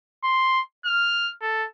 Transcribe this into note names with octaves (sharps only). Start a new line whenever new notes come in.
C6
F6
A4